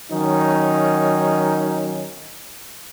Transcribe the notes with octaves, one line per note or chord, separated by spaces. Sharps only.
D#3 F#3 C#4 D#4